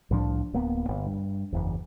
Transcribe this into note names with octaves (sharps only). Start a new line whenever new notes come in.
C2 A2 F3 D4
D1 A#3 B3
G1
G2
F#1 E2